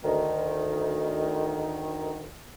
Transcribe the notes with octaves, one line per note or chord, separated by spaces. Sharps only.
D2 D#3